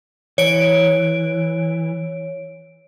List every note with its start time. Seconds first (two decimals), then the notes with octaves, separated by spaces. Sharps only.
0.38 E3 C#5 D7